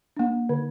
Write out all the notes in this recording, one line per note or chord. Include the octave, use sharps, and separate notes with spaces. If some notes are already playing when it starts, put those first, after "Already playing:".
A#3 D4
D3